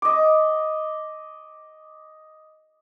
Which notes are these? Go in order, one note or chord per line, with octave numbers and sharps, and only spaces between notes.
D#5 D6